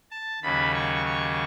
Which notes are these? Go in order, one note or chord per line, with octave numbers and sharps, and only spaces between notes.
A5
D#2 C#3 F#3 B5
C#6
C#6